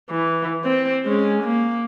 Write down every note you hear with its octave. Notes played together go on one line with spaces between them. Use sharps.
E3
C4
G#3 C#4
A#3